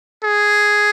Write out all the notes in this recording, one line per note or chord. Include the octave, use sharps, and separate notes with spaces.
G#4